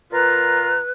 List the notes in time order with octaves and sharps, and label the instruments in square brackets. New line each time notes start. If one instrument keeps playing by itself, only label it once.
[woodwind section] A#2 F4 A#5 [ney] B4